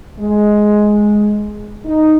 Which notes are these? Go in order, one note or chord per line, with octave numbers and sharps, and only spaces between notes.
G#3
D#4